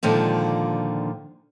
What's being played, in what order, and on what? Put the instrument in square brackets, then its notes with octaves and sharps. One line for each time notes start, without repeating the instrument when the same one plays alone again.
[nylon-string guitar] A#2 D3 D#3 F3 G#3